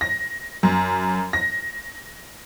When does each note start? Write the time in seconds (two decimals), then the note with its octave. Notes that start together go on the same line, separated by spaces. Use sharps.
0.01 A#6
0.63 F#2
1.33 A#6